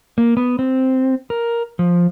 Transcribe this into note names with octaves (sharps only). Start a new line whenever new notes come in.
A#3
B3
C4
A#4
F3